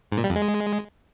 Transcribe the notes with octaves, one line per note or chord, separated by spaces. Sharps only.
G#2
A#2
G3
F2
G#3